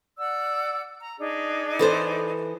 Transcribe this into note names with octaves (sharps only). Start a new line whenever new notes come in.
D5 F#5 E6
A#5
D4 D#4 G#4
E3 A4 C5